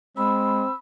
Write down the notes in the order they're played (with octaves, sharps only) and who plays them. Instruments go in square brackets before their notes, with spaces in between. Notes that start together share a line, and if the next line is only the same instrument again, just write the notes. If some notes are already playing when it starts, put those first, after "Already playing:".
[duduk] G#3 [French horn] C4 [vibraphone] B5 [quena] E6